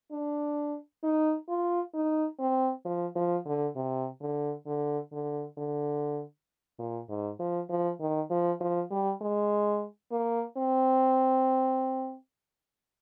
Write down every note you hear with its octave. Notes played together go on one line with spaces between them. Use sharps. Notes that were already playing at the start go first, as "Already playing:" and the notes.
D4
D#4
F4
D#4
C4
F3
F3
D3
C3
D3
D3
D3
D3
A#2
G#2
F3
F3
D#3
F3
F3
G3
G#3
A#3
C4